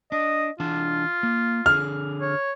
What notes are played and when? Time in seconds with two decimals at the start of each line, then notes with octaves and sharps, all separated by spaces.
0.12 D4 D#5
0.60 E3 D4 F4 A5
1.23 A#3
1.66 D3 G#4 F6
2.21 C#5